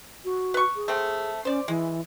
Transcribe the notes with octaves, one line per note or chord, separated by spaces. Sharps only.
F#4
B4 C#6
G#4
A3 C4
C#4 C5 D5
E3 G#3